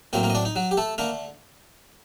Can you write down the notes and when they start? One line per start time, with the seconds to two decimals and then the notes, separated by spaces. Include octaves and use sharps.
0.13 A2 F#3 A#3 C4 A#4
0.23 A#3 A#4
0.30 D#5
0.35 D4 D5
0.45 D#4
0.56 F#3 F#4
0.71 G4
0.77 A3 A4
0.98 D3 A3 A#3 A#4